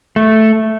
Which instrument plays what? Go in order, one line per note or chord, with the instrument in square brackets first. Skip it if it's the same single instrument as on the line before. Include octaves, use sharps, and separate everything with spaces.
[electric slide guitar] A3